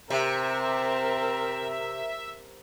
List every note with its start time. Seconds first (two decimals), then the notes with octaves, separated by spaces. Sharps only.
0.10 C3 C4 A#4 E5